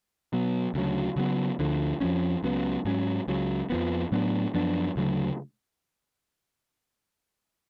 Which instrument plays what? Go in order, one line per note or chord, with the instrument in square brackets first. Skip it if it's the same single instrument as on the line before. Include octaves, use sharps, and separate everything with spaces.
[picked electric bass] B2 F#3 B3
D2 C#3 F#3
C#3 F#3 B3
D2 D3 F3
F2 F3 A3 C#4
C#2 C#3 F#3 B3
G#2 F#3 C#4
C#2 C#3 F#3
F2 F3 B3
A2 F#3 B3 D4
F#2 F3 B3 D4
D2 C#3 F#3